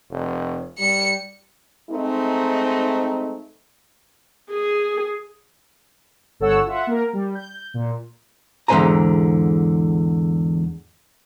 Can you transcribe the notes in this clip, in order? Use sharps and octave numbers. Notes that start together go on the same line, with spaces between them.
F1
G3 C#7
G#3 A3 C4 D#4
G#4
G1 A4 C#5 F#5 E6
F4 E5 F#5
A#3 A#4
G3
G6
A#2
E2 G#2 D3 C5 G#5 A#5